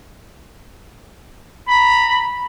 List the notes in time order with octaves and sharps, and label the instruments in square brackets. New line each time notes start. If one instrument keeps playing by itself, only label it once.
[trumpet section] A#5 B5